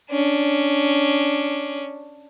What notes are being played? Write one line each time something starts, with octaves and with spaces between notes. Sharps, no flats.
C#4 D4